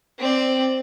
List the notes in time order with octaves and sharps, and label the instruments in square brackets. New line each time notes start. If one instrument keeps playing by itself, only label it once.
[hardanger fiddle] C4 D5